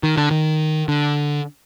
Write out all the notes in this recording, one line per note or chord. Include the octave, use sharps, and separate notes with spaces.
D#3
D3
D#3
D3